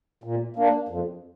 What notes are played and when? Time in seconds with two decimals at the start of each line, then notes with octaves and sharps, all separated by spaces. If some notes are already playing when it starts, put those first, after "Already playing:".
0.24 A#2
0.56 A#3 D4
0.89 F2